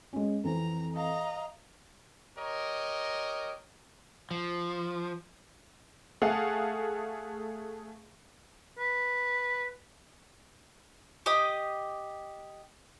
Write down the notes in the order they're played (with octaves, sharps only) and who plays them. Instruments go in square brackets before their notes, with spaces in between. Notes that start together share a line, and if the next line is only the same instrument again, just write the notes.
[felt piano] G#3 C#4
[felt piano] F2 E3 C4 [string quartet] A#5
[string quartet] D#5 F5 A#5
[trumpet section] G4 A#4 C#5 D#5
[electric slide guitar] F3
[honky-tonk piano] A3 G#4 F5 F#5
[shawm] B4
[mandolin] G4 D#5 D#6